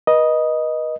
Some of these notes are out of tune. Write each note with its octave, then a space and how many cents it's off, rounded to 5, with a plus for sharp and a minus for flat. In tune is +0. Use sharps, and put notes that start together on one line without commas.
B4 -35 D#5 +0